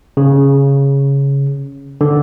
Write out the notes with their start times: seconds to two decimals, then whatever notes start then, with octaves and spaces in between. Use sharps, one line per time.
0.17 C#3
2.01 D3